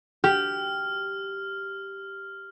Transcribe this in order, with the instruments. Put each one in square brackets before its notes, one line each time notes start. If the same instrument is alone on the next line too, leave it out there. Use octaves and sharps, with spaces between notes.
[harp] G4 [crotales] F6